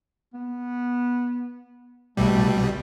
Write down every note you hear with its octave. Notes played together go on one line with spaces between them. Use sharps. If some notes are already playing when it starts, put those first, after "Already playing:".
B3
C2 B2 G3 A3